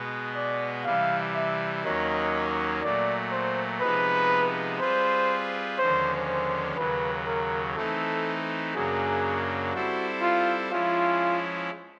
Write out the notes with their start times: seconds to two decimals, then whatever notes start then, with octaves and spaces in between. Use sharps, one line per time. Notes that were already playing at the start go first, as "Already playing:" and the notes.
Already playing: B2 G#3 B3
0.35 D5
0.85 C3 E3 G3 F5
1.35 E5
1.84 D#2 D#3 F#3 A#3 C#4 D#5
2.82 A#2 F#3 A3 D5
3.32 C5
3.81 C3 F3 G#3 B3 D#4 B4
4.79 G3 C4 F4 G#4 B4 C5
5.78 D#2 D3 F3 G#3 C#4 C5
6.28 C5
6.77 D#2 C#3 F#3 B4
7.26 A#4
7.75 E3 A3 C4 D#4 A4
8.74 F#2 C#3 F#3 A#3 D4 G#4
9.73 G3 C4 E4 F#4 A4 C5
10.22 F4
10.71 F3 G#3 C#4 E4 F4